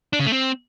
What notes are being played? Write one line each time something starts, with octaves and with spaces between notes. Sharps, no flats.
D4
C#3
A3
C4